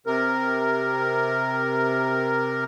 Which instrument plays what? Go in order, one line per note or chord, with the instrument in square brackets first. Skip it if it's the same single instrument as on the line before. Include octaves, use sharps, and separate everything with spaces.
[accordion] C3 A#4